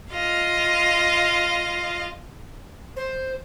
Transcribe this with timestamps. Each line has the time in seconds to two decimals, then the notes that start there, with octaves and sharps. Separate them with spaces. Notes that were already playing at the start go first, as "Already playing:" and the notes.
0.10 F4 D#5 F5
2.96 C5